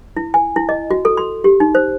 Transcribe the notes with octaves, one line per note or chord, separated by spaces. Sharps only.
E4
G#5
E4
D#5
F#4
A4
C6
G4
D#4
C5